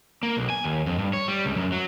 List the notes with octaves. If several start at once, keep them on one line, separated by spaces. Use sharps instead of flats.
A#3
B1
G#5
D#2
F2
G2
C#5
G3
C#2
F#2
F#3